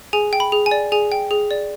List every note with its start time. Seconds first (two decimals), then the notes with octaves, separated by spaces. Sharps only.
0.13 G#4 G#5
0.33 G5
0.40 B5
0.52 G#4
0.66 G#5
0.71 D5
0.92 G#4 G#5
1.12 G5
1.31 G#4
1.51 D5